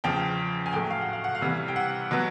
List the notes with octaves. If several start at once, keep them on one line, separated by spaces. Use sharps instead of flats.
E2 C#3 F3 G5
G#5
A2 F#3 A3 G5
F5
F#5
F5
F#5
F5
C3 E3 G3 B3
G5
F#5
B2 F#3 B3